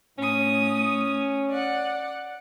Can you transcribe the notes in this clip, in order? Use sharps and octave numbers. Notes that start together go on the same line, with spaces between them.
A2 C#4 D#6
D5 F#5